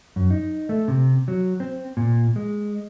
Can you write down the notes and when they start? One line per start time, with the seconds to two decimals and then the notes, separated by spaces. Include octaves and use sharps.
0.16 F#2
0.31 D#4
0.69 A3
0.88 C3
1.28 F#3
1.60 C4
1.97 A#2
2.36 G#3